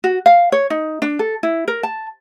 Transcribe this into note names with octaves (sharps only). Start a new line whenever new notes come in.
F#4
F5
C#5
D#4
D4
A4
E4
A#4
A5